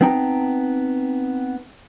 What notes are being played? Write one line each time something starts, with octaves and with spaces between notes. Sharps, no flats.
B3 C4 D#4 G5 A5 A#5